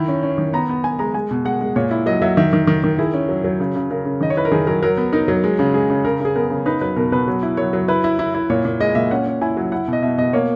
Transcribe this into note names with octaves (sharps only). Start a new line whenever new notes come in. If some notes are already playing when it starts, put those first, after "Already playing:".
Already playing: D#3 E4 B5
C#4
C#4
D#3
B3 A#5
B3
B3 G#5
G#3 A#5
G#3 G#5
B2
G#3 F#5
G#3
A#2 C#5
E4
F#3 D#5
F#3 E5
D#3 E5
D#3
D#3
D#3
E4 G#4
C#4
F#3
F#3
C#3
C#3
C#3 A#4
C#3
D#3 D#5
C#5
E4 B4
A#4
D#3 G#4
F#3 A#4
F#3 A#4
B3
D#4 A#4
F#3
G#3
C#3
G#3 G#4
C#3
C#3 A#4
C#3 G#4
B3 A#4
C#3
D#4 B4
F#3 B4
B2 A#4
B2 B4
F#3
E4
F#3 C#5
F#3
E4 B4
E4
E4
E4
A#2 C#5
A#2
G#3 D#5
A#2 E5
C#4 F#5
C#4
E4 G#5
F#3
E4 F#5
B2 D#5
B2 E5
B2 D#5
A#3 C#5